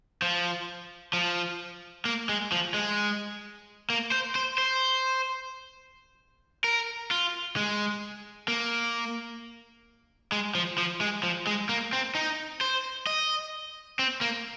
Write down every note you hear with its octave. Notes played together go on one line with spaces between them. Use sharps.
F3
F3
A#3
G#3
F3
G#3
A#3
C5
C5
C5
A#4
F4
G#3
A#3
G#3
F3
F3
G#3
F3
G#3
A#3
C4
D#4
C5
D#5
C4
A#3